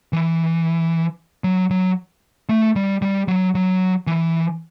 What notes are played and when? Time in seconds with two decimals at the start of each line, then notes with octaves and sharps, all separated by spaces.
0.13 E3
1.44 F#3
1.70 F#3
2.49 A3
2.76 G3
3.02 G3
3.28 F#3
3.55 F#3
4.07 E3